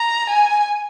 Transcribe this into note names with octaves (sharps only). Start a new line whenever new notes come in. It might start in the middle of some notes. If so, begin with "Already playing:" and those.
Already playing: A#5
G#5